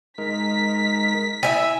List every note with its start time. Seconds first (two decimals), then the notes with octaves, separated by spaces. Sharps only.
0.18 G#3 D#4 A#4 B6
1.43 E4 E5 G#5